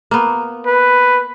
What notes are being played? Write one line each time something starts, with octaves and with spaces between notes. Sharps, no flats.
A#3 B3
B4